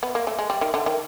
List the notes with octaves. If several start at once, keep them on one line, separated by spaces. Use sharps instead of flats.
B3
A#3
A3
G#3
G3
D#3
D3
D#3